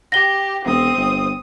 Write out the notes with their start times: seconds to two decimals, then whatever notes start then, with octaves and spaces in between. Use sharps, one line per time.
0.12 G4 A#6 G7
0.65 E1 C4 D#6
0.97 G1